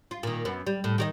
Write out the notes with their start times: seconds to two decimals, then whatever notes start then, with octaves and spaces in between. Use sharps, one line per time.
0.11 F4
0.23 A#2 D#3
0.45 F#2 B3
0.67 G3
0.84 A2
0.98 D#3 G4 D#5